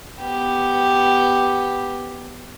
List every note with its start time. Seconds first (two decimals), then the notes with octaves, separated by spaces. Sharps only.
0.21 B3 G4